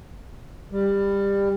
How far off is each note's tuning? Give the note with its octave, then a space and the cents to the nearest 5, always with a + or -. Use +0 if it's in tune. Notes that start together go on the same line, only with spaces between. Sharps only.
G3 +20